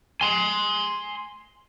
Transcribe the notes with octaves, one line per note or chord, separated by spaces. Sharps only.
G#5 C6